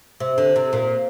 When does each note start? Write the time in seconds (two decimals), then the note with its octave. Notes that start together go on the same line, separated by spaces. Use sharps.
0.20 C3
0.38 D3
0.56 C3
0.73 A#2